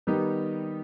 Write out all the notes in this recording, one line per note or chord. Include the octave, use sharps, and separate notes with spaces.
D#3 G3 B3 D#4 G4